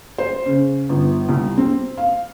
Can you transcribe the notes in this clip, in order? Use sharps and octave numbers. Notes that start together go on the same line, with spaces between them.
C5
C#3
G1
C2
C4
F5